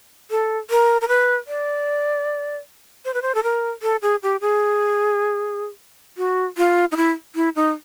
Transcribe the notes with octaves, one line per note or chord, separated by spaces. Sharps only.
A4
A#4
A#4
B4
D5
C5
B4
C5
A4
A#4
A4
G#4
G4
G#4
F#4
F4
D#4
E4
E4
D#4